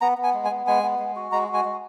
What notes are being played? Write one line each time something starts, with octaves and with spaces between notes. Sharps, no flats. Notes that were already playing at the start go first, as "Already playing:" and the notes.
B3 A#5
B3
G#5
G#3
G#5
B3
G#3 G#5
B3
G#3
F#4
G#3 A#5
F#4
G#5
G#3